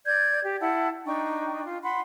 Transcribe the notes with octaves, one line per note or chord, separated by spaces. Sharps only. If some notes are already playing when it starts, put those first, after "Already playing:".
D5 G6 G#6
G4
E4 F#5 A5
D4 D#4 G5 C#6
F4
F#5 B5 C6